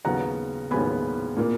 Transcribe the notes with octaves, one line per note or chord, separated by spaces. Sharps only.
D#2 C#3 F#3 B3 F#5 A#5
D#2 C#3 F#3 B3 G#5 B5
A#2 A#3